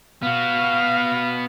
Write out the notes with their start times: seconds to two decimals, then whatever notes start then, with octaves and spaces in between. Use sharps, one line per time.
0.23 B3 F#4 F5